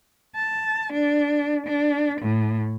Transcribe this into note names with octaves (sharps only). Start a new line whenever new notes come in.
A5
D4
D4
A2